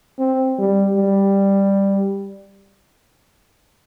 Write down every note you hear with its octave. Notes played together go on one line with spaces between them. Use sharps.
C4
G3
G3